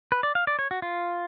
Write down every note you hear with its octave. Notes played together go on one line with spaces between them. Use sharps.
B4
D5
F5
D5
C#5
F#4
F4